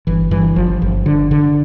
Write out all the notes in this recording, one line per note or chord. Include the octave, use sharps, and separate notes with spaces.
G1 E3
G2 E3
G1 F3
G1
D3
D3